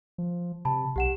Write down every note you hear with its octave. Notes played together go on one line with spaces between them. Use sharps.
F3
C3 A5 B5
B1 G4 F#5 E7